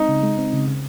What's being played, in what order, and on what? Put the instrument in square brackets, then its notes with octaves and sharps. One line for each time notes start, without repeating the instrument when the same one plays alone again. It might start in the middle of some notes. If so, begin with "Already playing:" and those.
Already playing: [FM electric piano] G#3 C4 [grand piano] D#4
[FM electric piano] C#3
G#3
C4
C#3
C#3